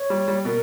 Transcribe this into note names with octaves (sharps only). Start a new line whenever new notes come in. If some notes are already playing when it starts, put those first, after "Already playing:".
Already playing: C#5
G3
G3
B2 A#4